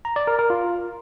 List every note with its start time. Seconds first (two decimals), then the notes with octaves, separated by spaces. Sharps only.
0.05 A#5
0.16 D5
0.27 A#4
0.39 A#4
0.50 F4